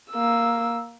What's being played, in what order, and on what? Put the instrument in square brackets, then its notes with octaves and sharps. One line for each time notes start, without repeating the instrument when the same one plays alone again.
[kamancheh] A#3 E6